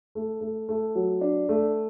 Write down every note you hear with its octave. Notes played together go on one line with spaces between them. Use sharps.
A3
A3
A3
F#3
D4
A3